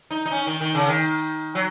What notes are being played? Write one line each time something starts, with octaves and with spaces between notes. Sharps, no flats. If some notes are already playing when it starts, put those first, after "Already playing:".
D#4
D#4
C#4
D#3
D#3
C#3
D#3
F#3